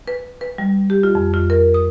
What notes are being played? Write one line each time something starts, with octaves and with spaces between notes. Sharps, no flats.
B4
B4
G3
G4
F4
F2
F4
A#4
D#6